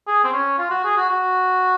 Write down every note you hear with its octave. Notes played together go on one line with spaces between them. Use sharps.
G#4
C4
C#4
F4
F#4
G#4
F#4
F#4